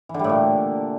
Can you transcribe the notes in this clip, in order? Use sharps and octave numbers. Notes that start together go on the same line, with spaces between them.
E3
D3
G3
A2
A#2